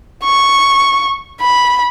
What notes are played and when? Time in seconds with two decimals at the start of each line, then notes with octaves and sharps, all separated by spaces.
0.24 C#6
1.41 B5